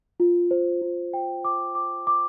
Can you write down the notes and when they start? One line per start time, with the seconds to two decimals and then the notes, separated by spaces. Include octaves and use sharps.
0.20 F4
0.51 C5
0.81 F4
1.14 G5
1.45 D6
1.75 D6
2.07 D6